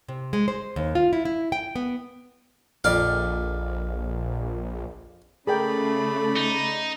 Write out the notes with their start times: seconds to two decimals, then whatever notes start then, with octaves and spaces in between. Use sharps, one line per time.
0.08 C3
0.33 G#3
0.48 C5
0.76 D#2
0.95 F4
1.13 E4
1.25 E4
1.52 G5
1.76 B3
2.84 A#1 F2 D5 F5
5.47 C#3 A3 G#4 A#4 D5 G5 B5
6.36 D#4